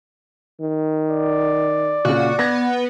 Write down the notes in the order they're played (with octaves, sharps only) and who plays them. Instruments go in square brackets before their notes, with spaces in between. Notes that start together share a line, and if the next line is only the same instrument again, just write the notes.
[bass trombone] D#3
[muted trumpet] D5
[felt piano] A#2 C#3 [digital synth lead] F#4
[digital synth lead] B3 [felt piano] G#6 A#6